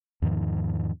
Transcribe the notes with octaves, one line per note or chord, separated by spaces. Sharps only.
E2 G#2 D#3 F3